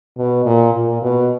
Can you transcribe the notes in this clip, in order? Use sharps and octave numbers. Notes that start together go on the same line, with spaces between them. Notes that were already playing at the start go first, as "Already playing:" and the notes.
B2
A#2
A#2
B2